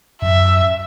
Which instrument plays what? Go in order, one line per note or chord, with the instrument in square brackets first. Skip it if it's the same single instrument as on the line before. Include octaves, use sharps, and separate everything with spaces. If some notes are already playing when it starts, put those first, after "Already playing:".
[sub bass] F#2 [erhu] E5